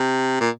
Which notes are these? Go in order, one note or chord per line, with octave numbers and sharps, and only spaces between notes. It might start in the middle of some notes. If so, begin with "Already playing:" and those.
Already playing: C3
A#2